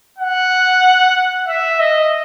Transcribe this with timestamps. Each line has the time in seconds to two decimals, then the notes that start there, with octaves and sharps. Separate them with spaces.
0.18 F#5
1.48 E5
1.80 D#5